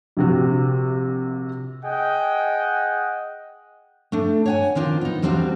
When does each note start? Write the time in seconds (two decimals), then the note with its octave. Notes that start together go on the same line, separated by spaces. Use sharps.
0.17 A#1 C3 F#4
1.84 G#4 D#5 F#5 G5
4.12 A3 D4
4.46 C#5 F#5 G#5
4.75 D#3 C4 D4 F4
5.01 B3 D#4
5.22 E2 G3 C4 D4 F#4 F5